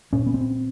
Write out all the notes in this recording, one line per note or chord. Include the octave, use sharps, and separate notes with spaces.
A#2 C#4
B3
C4